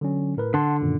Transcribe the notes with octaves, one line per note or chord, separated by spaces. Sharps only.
D3 F#3 C#4
A2 A#4 B4
D3 F#5 A5 C6
F#2 A#2 D#3